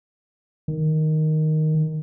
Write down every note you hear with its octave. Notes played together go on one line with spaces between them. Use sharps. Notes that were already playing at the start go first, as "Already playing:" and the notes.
D#3